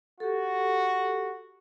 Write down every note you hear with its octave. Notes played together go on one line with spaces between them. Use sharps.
F#4 G4 A4